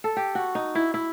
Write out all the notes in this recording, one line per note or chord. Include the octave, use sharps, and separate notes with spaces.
A4
G4
F#4
D#4
E4
E4